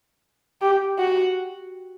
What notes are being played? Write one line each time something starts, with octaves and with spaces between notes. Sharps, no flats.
G4
F#4